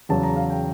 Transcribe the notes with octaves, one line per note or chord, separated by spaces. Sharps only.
E2 C#3 F#3 A5
A#5
F5
G5